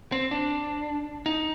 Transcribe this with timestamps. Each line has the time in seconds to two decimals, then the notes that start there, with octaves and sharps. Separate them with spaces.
0.12 C4
0.31 D4
1.26 D#4